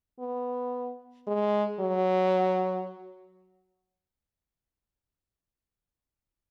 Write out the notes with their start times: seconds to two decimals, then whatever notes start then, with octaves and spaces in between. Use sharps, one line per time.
0.19 B3
1.27 G#3
1.80 F#3